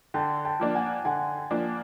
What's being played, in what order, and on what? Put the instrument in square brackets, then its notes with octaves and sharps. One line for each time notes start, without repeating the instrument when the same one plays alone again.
[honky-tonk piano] D3 [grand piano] G5 A5
[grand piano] G5 A5
[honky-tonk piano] F3 A#3 D4
[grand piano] F#5 G#5
[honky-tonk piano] D3 [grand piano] F#5 G#5
[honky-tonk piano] F3 A#3 D4